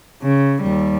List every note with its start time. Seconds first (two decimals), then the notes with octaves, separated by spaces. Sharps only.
0.23 C#3
0.63 D#2 G3